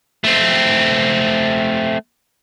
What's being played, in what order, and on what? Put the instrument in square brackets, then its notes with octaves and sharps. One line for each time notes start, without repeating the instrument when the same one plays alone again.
[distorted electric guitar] A3 C4